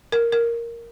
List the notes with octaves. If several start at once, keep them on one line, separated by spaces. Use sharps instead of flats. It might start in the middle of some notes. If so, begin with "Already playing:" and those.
A#4
A#4